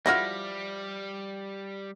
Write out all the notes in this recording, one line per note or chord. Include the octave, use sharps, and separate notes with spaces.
F3 G3 E4 F#4 F6 A#6